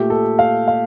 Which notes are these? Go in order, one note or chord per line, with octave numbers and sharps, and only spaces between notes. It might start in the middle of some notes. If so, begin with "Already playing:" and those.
Already playing: A#2 A3 G4
A4
F5
F5